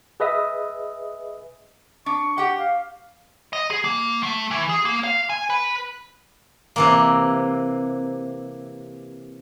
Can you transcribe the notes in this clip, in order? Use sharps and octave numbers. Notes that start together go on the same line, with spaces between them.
G#4 B4 D#5 E5 D#6
D4 C#6
G4 F#5
F5
D#5
G#4
A#3
A3
E3
G#4
A#3
F5
G#5
B4
C3 E3 A#3